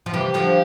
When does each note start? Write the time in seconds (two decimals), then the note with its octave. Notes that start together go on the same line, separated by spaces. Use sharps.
0.06 F3
0.14 C3 E3 G4
0.34 D3 F3